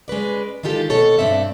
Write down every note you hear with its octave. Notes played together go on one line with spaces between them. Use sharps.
G#3 C#4 B4 D5
D#3 G#3 F4 G4 A4
B2 A4 C#5
G2 C4 D5 E5